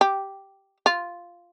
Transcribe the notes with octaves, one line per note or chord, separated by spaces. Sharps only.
G4
F4